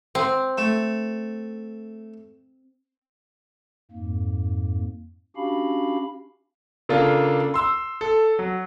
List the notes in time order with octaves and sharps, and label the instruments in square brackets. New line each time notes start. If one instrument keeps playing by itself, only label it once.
[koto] C4
[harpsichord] A3
[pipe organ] F2 G#2 A#3
C#4 D4 F#4 G4 F5 B5
[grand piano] C#3 A#3 D4 F4 A4
C6 E6
A4
F#3